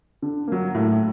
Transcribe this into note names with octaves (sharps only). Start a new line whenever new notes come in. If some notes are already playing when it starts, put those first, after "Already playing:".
D3
F#3 A#3
A2